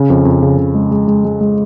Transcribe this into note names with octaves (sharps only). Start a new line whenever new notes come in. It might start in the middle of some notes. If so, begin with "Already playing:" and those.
Already playing: C#3
F2
F2
C#3
C#3
G#3
G#3
G#3
G#3
G#3